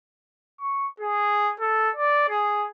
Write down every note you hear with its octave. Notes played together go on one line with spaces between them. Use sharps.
C#6
G#4
A4
D5
G#4